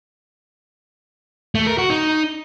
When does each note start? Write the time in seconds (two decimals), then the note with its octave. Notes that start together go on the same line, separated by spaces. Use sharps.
1.55 A3
1.67 A#4
1.78 F#4
1.90 D#4